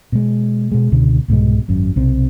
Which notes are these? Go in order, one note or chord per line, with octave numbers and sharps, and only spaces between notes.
B2 G#3
B2 G#3
C#2 B2 D3
C2 G#2 B2 G#3
G#1 F#2
B1 C3 C4